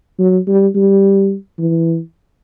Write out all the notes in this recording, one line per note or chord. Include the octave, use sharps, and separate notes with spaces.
F#3
G3
G3
E3